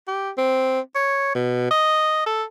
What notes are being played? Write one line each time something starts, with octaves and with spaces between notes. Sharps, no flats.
G4
C4
C#5
B2
D#5
A4